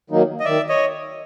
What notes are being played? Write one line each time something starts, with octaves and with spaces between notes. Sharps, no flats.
D#3 F#3 A#3 D#4
D#5
D#3 D5 E5
C#5 D#5